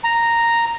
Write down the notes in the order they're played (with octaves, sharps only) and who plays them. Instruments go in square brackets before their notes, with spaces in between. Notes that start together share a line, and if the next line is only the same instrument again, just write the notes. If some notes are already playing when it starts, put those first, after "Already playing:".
[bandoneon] A#5